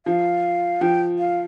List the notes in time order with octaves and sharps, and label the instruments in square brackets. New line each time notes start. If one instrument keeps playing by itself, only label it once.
[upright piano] F3 [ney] F5
[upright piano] F3 [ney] G5
[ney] F5